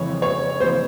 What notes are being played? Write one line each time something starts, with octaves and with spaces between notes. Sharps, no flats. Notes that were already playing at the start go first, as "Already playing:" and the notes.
Already playing: F2 C#3 E3 G#3 C#5
C#5
F2 C#3 E3 G#3 C5